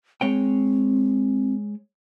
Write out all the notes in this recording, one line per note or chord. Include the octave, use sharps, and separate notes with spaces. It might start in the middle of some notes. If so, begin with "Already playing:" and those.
G#3 C4 C#5 G5